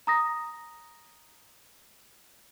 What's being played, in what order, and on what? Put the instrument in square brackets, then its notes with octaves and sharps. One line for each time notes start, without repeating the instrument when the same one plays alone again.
[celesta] A#5 D#6 A#6